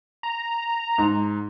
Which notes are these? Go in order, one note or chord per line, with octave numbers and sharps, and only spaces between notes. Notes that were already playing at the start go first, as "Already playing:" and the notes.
A#5
G#2